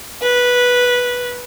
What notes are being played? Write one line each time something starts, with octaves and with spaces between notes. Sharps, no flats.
B4